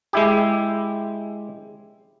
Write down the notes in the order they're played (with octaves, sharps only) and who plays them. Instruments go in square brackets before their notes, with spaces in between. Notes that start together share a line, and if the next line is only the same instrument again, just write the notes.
[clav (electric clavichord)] G#3 E4 G4